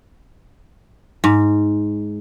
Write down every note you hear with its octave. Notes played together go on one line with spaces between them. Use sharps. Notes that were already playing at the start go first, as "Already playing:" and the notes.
G#2